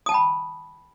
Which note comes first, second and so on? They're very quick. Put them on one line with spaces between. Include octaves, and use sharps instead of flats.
D#6 A5 G5 B5